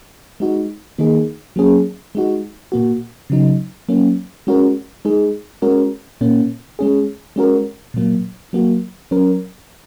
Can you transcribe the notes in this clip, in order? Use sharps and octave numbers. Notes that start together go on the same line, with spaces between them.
G#3 D#4 F#4
D#3 A#3 D#4 G#4
F#3 A#3 C#4 G#4
G#3 D#4 F#4
A#2 A#3 F#4
C#3 F#3 D#4
F#3 A#3 C#4
G#3 C#4 F#4 A#4
G#3 D#4 G#4
G#3 C#4 F#4 A#4
A#2 A#3 C#4
G#3 C#4 G#4
G#3 C#4 F#4 A#4
A#2 F#3 A#3
F#3 A#3 F#4
F#3 C#4 A#4